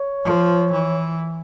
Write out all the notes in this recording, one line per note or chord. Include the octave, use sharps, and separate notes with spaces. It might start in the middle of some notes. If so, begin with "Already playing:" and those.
Already playing: C#5
F3
E3